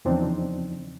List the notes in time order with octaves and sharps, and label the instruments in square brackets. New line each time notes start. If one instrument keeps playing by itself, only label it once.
[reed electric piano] E2 C#3 F3 C4 D4 D#4